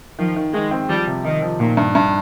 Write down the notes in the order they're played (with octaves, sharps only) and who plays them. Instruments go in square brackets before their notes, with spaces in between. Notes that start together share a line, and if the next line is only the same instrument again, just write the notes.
[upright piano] D#3 [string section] F3
[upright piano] D#3
[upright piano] D#3 [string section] G#3
[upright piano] C4
[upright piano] F3 [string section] G3
[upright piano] C3
[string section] D#3 [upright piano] D#4
[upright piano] F3
[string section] A#2 [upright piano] D#3
[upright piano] G2
G2